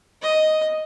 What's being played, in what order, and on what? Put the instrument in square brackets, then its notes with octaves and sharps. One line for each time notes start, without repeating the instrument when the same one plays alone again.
[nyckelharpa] D#5